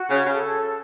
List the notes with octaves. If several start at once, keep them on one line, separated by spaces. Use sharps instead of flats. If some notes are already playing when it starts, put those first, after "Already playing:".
Already playing: F#4
C#3 C#5
C#3
A4